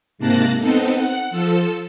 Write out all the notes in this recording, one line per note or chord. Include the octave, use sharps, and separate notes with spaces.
G#2 C3 A#3 A5 F#6 A#6
B3 C4 D#4 A4
F#5
F3 A4 E6